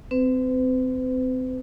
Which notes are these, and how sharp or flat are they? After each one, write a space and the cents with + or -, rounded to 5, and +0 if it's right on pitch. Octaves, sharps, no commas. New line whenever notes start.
C4 -20 B4 +45